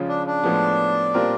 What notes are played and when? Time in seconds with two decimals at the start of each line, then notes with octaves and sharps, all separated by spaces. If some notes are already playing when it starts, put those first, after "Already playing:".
Already playing: C#3 F3 G#3 C#4 F4
0.08 D4
0.27 D4
0.44 A2 F3 G#3 B3
1.14 A#2 G3 C4 F4 A#4